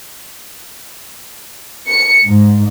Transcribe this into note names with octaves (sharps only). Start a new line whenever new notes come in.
C#7
G#2